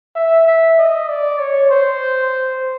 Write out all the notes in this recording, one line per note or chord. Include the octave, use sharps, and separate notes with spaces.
E5
E5
D#5
D5
C#5
C5